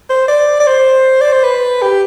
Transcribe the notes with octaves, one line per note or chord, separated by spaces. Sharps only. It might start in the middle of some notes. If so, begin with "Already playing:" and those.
C5
D5
D5
C5
D5
C5
B4
G4